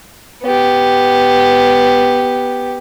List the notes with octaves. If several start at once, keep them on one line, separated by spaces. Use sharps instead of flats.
B3 G4